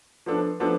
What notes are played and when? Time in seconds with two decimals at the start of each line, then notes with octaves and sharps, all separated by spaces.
0.26 F3 B3 D4 A4
0.60 F3 B3 D4 A4